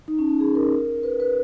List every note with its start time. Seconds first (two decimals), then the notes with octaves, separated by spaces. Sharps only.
0.08 D#4
0.19 C#4
0.29 C#4
0.40 G#4
0.55 A#4
1.03 B4
1.20 B4